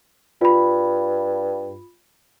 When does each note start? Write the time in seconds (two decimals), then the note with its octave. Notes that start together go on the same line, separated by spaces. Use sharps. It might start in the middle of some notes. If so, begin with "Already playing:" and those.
0.41 G2 F4 B5